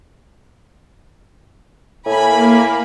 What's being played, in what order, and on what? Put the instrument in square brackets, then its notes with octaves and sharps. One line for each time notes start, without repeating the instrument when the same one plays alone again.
[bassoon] A2 [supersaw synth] A#3 [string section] G#5 B5